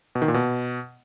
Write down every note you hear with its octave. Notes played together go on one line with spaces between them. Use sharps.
B2
D#3
A#2
B2